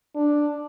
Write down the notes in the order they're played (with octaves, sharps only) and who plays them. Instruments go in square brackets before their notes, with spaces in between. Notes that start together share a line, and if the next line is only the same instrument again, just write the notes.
[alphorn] D4